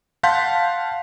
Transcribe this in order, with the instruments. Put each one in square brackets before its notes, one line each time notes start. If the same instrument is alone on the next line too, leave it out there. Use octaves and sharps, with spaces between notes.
[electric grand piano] F5 F#5 A5 C6 G6 B6